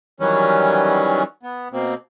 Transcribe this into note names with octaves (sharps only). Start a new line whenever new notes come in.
D#3 E3 F#3 G3 C#4
B3
B2 A#3 C4